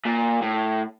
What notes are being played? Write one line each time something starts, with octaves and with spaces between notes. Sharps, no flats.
A#2
A2